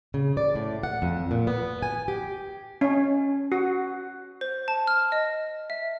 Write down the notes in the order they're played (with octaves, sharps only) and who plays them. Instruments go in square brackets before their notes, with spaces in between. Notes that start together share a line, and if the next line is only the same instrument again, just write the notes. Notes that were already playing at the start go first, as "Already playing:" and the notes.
[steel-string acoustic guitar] C#3
D5
A2
F#5
F2
A#2
B3
G#5
G4
[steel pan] C#4
F#4
[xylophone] C5
A5
F6
D#5
E5